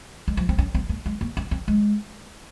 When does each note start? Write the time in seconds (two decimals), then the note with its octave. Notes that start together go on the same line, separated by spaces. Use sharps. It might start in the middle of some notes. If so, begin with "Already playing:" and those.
0.28 G#3
0.37 F3
0.49 C4
0.58 C#4
0.75 C4
0.89 A#3
1.06 G#3
1.21 A#3
1.37 C#4
1.51 C4
1.68 G#3